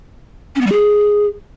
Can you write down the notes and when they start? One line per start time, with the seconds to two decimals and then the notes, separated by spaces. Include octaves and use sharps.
0.56 C#4
0.61 B3
0.67 G3
0.72 G#4